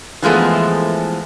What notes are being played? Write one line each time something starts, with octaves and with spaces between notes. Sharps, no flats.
E3 F3 G#3 A3 B3